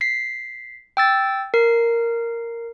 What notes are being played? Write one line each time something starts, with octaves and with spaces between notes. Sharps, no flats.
B6 C7
G5 E6 A6
A#4 C7